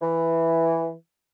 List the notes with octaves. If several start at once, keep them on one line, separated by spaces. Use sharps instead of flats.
E3